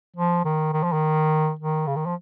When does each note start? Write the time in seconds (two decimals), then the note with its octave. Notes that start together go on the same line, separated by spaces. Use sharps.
0.16 F3
0.45 D#3
0.73 D#3
0.83 F3
0.93 D#3
1.59 D#3
1.87 C#3
1.96 D#3
2.06 F3